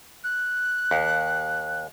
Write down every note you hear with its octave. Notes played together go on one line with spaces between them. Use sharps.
F#6
D#2